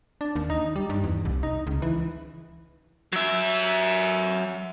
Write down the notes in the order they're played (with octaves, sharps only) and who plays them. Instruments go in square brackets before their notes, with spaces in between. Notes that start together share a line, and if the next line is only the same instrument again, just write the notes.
[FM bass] D4
D#2
D#4
G3
G2
E2
C2
D#4
C#2
E3
[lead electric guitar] F#3 E5